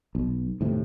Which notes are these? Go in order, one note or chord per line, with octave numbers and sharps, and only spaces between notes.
B1
D#2 A2 C3